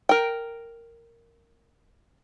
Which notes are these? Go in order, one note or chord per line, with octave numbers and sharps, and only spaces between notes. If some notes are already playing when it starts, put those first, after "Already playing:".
A#4 G5